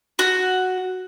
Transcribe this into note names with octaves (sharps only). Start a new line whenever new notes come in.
F#4